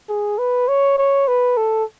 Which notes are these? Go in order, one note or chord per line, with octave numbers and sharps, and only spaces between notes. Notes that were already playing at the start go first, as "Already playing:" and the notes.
G#4
B4
C#5
C#5
B4
A4